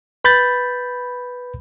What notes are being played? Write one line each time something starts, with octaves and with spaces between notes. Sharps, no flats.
B4 B5 G6 A6